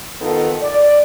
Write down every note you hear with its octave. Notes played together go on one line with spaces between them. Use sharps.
D#3 B3 D#4 F4 A4
D5